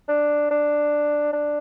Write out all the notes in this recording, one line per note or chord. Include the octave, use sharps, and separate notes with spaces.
D4
D4
D4